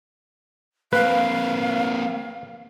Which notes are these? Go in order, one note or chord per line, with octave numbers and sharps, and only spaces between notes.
A#3 C4 B4 F5